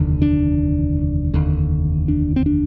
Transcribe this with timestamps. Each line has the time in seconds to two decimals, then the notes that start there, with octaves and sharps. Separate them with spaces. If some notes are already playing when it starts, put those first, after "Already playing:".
Already playing: F1 D#2 D3
0.22 D4
1.33 F1 D#2 D3
2.08 D4
2.36 C4
2.46 D4